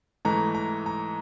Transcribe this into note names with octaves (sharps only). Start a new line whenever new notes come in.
G#2 E3 A3 A#5
A#5
A#5